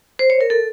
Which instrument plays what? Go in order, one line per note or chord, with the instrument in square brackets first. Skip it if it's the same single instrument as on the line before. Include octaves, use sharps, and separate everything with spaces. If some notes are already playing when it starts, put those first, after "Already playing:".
[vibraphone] C5
C#5
A#4
A4